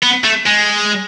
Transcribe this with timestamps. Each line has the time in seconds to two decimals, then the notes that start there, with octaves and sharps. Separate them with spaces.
0.03 B3
0.24 A3
0.46 G#3